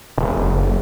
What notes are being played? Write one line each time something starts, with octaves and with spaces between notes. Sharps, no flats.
E1
F#1